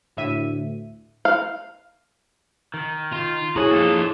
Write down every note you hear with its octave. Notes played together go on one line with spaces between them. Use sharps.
D2 A2 E5 D#7
F5
D#3
F4
E4 F#4 G#4 C#5 G#5 A#5
F3 A#3 F4 A4